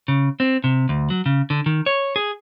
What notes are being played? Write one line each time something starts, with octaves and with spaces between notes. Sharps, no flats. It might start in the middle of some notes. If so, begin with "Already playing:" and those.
C#3
C4
C3
D2
F#3
C#3
D3
D#3
C#5
G#4